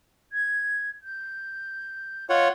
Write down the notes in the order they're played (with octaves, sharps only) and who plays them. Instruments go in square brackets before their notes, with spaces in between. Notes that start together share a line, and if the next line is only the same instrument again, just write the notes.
[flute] G#6
G6
[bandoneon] F4 C#5 F#5 [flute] D#5